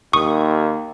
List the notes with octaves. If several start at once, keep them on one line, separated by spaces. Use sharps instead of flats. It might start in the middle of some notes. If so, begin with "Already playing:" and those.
D#2 C#6 D#6